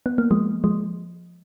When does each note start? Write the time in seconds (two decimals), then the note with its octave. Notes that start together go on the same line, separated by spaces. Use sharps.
0.06 B3
0.18 A#3
0.31 F3 G#3
0.64 F3 G#3